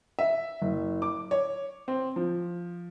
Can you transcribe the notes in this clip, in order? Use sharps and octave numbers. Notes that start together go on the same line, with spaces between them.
E5
F#1
D6
C#5
C4
F3